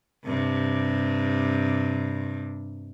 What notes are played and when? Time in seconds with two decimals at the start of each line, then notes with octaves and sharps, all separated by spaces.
0.24 G2 C3